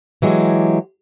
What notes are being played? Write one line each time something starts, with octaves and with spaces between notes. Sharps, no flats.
E3 F#3 G#3 G4